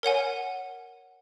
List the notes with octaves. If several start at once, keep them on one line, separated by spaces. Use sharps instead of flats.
A#4 C#5 F#5 G#5